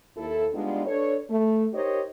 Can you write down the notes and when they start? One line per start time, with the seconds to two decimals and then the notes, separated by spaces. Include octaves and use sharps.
0.17 D#2 E4 A4
0.53 G3 G#3 B3 D4 D#4 F4
0.86 D4 A4 B4 C#5
1.30 A3
1.73 D#4 G4 A#4 C5 C#5 D#5